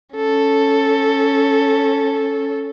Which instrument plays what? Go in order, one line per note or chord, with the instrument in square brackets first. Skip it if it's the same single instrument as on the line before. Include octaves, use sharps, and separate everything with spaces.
[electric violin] C#4 A4